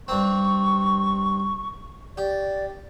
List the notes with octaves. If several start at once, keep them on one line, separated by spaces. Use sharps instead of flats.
G2 C4 C#6
G4 D5